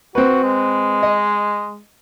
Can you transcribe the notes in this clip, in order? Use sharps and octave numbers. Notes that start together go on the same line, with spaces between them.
C4 F#4 B4
G#3
D#5